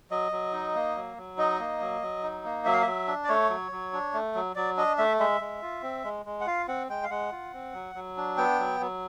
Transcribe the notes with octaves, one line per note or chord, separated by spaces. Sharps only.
F#3 D#5
F#3
D#4
A#3
F#3
F#3
D#4 D#5
A#3
F#3
F#3
D#4
A#3
F#3 E5
F5
F#3 E5
D4
D5
A3 C#5
F#3
F#3
D4
A3
F#3
F#3 D5
D4 D#5
A3 E5
G#3 E5
G#3
F4
C4
G#3
G#3
F#5
F4 F5
C4 F#5
G#3 G5
F5
G#3 F#5
F4
C4
F#3
F#3
D4
B3 G5
F#3
F#3